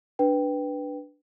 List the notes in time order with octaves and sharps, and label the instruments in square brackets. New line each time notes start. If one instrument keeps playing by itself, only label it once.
[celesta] D4 B4 G5